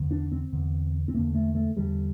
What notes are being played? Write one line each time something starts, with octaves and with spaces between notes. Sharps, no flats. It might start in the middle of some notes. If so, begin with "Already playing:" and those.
Already playing: E2 D3
D4
C4
E2 D3
C4
E2 D3 A#3
A3
A3
E2 D3 G3